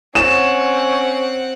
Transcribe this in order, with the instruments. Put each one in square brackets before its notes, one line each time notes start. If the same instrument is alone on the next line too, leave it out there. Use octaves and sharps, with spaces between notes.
[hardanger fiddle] C4 F#5 [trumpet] C#4 [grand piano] E7